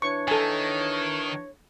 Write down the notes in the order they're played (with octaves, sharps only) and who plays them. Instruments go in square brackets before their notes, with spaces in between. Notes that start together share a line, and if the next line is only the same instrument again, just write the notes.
[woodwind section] E3 D4 C#5 [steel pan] C#6
[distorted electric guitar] D#3 [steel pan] A4 G#5